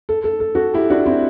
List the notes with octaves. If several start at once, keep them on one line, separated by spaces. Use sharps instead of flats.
A4
A4
A4
F#4 A4
E4 G4
D4 F#4
C4 E4